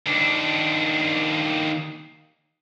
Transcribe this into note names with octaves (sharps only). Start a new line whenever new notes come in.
D#2 D4